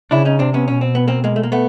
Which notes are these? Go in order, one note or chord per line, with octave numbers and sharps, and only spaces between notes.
C#3 D4 E4
C#4 D#4
C3 C4 D4
B3 C#4
B2 C#4
C4
B3
A#3 C4
G#3 A#3
A3
A#3
A3 B3